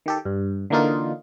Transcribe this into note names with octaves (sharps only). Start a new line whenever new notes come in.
D#3 G4 A4
G2
D3 E3 A#3 D#4 F4